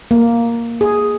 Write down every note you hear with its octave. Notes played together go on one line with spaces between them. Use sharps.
A#3
G#4